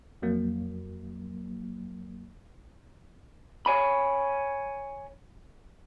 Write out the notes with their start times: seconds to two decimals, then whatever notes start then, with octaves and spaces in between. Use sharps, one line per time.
0.22 F2 F#3 A#3
3.66 C#5 G#5 B5